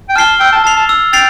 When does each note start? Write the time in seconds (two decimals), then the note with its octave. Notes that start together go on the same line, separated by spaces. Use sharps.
0.09 G5
0.16 A5 F6 C7 G7
0.40 G5 E6
0.52 A5
0.64 A5 A6 C7 F7
0.76 A5
0.89 E6
1.13 G5 A6 C7 F7